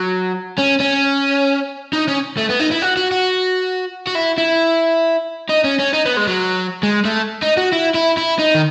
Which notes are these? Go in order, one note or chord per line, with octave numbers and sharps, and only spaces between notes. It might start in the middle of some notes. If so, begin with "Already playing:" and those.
Already playing: F#3
C#4
C#4
D#4
C#4
A3
B3
D#4
E4
F#4
F#4
F#4
F#4
E4
E4
D#4
C#4
C#4
D#4
B3
G#3
F#3
G#3
A3
D#4
F#4
E4
E4
E4
D#4
D#3